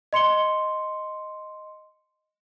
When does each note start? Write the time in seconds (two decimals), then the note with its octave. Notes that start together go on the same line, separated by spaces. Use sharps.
0.13 D#5 C6 C#7 G7